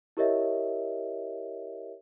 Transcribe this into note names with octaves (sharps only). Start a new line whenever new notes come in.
E4 G4 A#4 C#5 D#5 E5